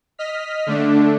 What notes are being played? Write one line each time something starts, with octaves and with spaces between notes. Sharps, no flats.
D#5 F6 B6
D3 A3 D4